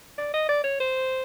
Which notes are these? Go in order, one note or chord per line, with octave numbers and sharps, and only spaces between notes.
D5
D#5
D5
C#5
C5